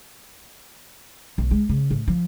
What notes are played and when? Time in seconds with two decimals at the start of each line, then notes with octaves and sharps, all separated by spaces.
1.38 B1
1.51 G#3
1.69 C#3
1.91 A2
2.08 F3